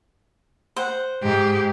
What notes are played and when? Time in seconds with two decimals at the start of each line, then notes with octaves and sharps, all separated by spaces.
0.76 C5 F#5
1.23 G#2 G4